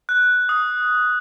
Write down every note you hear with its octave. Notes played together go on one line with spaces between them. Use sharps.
F#6
D#6